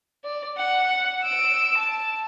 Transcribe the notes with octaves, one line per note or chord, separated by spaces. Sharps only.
D5
F#5
E6 D7
A5